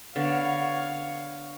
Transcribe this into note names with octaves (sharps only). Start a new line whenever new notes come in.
D3 B3 C#5 F5